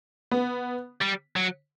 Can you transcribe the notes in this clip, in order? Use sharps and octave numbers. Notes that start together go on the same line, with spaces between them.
B3
G3
F#3